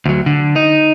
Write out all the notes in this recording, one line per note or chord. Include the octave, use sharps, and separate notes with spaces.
D2 F#3
D3
D#4